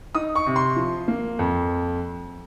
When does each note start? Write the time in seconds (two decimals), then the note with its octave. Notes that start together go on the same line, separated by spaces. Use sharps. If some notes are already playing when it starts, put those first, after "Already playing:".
0.15 D#4 D#6
0.35 C#6
0.46 C3
0.56 C6
0.76 F3
1.08 A#3
1.39 F2